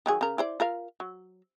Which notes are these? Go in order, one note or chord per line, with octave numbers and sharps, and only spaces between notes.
D#3 F#3 G#4
C#3 A#4
E4 C5 D5
F4 A#4 F5
F#3